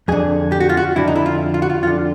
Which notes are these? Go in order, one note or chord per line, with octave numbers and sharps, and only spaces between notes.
F2 D3 G#4
G4
F#4
F4
F#4
F2 D3 E4
D#4
E4
F4
F4
F#4
F4
F2 D3 F4